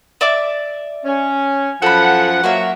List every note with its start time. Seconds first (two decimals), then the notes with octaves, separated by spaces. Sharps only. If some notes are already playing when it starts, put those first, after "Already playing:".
0.21 D5 E5 D6
1.05 C#4
1.82 F#2 F3 A4 F#5 B5
2.44 F#3 A#3 F#4 C#5 E5